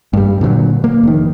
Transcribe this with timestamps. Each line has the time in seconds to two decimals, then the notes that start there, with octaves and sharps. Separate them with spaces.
0.13 G2 G3
0.41 A#2 D3 D#3 F#3
0.84 A#3
1.03 F1 D#3